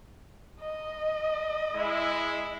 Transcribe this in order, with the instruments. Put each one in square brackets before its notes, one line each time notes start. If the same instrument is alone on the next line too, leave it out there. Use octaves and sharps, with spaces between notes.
[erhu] D#5
[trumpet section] G#3 E4